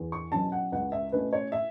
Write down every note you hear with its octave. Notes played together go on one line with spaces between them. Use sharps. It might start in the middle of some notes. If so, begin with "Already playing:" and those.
Already playing: E2
C#6
B2 F#3 C#4 A5
F#5
C#2 F#5
E5
B2 A3 C#4 B4
C#5
E5